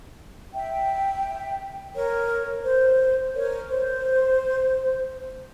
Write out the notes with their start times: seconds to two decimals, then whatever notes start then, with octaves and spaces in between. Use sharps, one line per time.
0.54 E5 G5
1.95 A#4 C#5
2.65 C5
3.35 A#4 C#5
3.70 C5